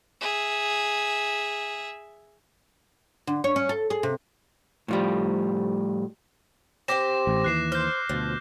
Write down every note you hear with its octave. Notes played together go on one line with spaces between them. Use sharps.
G#4 E5
D3
C#5
C#4
A4
G#4
C3
A2 F3 G3
C4 G4 C5 D6 A#6 E7
A1
D#2 E3 F#6 C7 E7
C5 F6 G6
D2 B2 F3